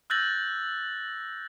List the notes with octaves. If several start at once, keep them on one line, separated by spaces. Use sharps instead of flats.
E6 F#6 G6 A6 A#6 F#7